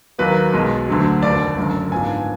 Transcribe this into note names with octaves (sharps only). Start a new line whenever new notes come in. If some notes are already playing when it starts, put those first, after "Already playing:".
D#2 D#3 F#3 A#3 B4
B1 B2 G#3
D2 D3 F#3
F1 D#2 D3 D5
F#1 F#2 D3
G#2 F3 B3 D4 G#5